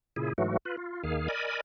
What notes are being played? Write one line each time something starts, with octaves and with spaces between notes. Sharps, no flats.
A#2 C#3 E4 G#4
G#2 E3 F#3 A3 F#4
F4 B4
F4
D#2 D#3 G#4 F5
A#4 D5 D#5 G#5 B5